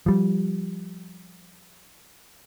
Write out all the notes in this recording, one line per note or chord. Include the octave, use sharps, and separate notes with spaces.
F3 G3